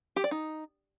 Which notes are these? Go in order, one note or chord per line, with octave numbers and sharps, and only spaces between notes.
G4
D5
D#4